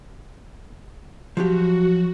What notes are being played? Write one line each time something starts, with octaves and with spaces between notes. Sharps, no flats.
F3 F#3 F#4 G4